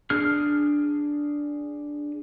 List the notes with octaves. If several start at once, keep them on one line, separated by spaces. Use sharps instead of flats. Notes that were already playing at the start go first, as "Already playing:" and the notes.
D4 G#4 F6